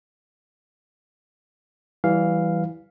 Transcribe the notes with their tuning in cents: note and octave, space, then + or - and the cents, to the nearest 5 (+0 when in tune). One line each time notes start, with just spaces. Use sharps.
E3 +0 G3 -25 F5 +0